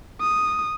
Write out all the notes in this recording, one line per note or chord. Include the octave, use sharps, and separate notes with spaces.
D#6